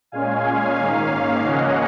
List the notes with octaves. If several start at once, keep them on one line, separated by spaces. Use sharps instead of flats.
A#2 G#3 C#4 F5 G#5
G#2 D#3 A#3 C#4 F5
C#3 F3 A#3 C#4 D#5 F#5